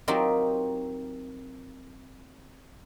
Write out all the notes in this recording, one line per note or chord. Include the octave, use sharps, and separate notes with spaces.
F#3 C4 D#4 F4 G4 A#4